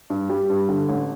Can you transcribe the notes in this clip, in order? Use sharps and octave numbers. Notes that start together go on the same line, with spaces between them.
G2
G3
G2
D3
A1